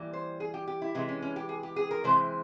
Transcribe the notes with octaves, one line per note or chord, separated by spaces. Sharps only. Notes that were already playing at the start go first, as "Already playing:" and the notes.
Already playing: E3 G3 A#3
C5
G#4
G4
G4
E4
C3 E3 G#3 E4
C#4
C#4
G4
G#4
G4
G#4
A#4
C3 E3 G#3 C5